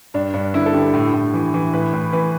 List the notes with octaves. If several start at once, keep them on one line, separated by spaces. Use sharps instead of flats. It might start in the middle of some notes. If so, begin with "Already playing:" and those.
G2 D4
G2 D4
D3 E4
A4
D3 G4
A2
A2
E3
E3
A2 B4
A2
E3 B4